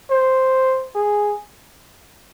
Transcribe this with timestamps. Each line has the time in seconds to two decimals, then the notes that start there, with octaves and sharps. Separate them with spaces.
0.10 C5
0.95 G#4